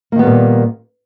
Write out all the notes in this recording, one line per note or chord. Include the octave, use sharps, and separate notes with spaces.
A#2 D#3 G3 A#3 B3